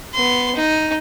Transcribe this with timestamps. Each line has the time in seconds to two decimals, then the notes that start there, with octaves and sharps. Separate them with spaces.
0.14 B3 C6
0.55 D#4